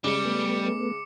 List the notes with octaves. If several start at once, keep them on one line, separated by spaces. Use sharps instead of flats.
C#3 G3 G#3 D6 C#7
A3 B3